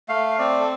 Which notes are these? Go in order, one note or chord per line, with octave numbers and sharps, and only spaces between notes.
A3 F5
C4 D5
A4